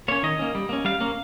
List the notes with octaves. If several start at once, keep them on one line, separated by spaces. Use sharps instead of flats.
A#3 C#4 C#5
D#3 D#5
A#3 C#4
G3
A#3 C#4
G3 F5
A#3 C#4